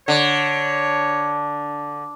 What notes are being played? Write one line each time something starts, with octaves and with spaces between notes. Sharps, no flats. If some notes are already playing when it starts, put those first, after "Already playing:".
D3 C#5